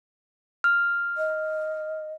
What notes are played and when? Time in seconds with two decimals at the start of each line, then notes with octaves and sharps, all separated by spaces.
0.64 F6
1.17 D#5